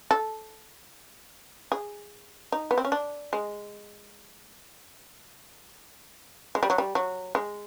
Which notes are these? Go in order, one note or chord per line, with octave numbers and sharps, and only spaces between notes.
A4
G#4
D#4
B3
C4
C#4
D4
G#3
G#3
G3
F#3
G3
F#3
G#3